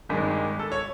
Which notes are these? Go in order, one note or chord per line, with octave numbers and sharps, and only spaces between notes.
G#1 G2 D#3 G#3
A4
C#5